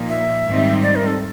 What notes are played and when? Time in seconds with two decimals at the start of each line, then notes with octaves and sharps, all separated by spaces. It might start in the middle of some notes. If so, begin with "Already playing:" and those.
Already playing: A#2 F3 A#3 D#4
0.09 E5
0.46 G#2 D#3 G3 C4 D#4
0.83 D5
0.96 A#4
1.07 A4